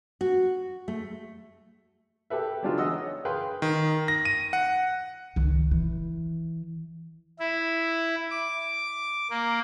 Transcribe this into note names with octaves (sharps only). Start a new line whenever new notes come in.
F#4
A3
G4 A4 B4 E5
F#3 G#3 D4 D#4 F4
E3 D#5 F#5 E6
C#5
G#4 B4 F5 G5 C6
D#3
A#6
D#7
F#5
C#2 D#3
E3
E4
D6
A#3